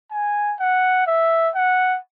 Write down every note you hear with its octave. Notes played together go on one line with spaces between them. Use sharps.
G#5
F#5
E5
F#5